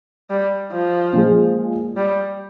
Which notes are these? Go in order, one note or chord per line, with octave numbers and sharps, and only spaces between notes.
G3
F3
A#2 F3 G#3
G3